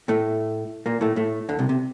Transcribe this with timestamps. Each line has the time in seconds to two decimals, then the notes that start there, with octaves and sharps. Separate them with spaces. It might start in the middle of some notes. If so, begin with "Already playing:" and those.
0.08 A2 A3
0.86 A#2 A#3
1.01 A2 A3
1.16 A2 A3
1.49 D2 D3
1.59 C2 C3
1.69 C3